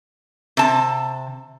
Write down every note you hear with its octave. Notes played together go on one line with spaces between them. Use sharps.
C3 A5